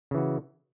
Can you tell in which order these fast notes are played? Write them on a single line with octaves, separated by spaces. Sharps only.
C#3 E3 F#4